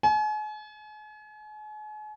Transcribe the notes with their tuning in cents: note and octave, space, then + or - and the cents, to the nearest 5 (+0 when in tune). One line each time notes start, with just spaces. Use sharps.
G#5 +40